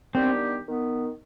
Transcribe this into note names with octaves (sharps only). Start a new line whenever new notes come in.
D#3 G3 B3 C4 D4 G4
D#3 B3